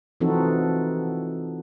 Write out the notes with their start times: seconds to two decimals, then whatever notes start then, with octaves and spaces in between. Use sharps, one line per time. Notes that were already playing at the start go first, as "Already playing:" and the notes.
0.21 E3 F3 C4 D#4 F#4 A4